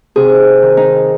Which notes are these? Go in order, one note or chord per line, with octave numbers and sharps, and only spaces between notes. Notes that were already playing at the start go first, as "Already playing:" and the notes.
C3 G#4
D#3
D#4